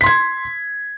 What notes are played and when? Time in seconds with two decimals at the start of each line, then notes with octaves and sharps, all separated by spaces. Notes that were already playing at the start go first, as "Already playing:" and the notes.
0.01 B6
0.04 C6
0.06 G#6